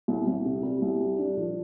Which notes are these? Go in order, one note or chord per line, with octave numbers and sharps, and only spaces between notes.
C2
C2
C3
G3
C2
G3
D4
F3